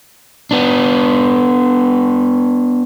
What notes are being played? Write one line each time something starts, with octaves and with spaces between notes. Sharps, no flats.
B3 D4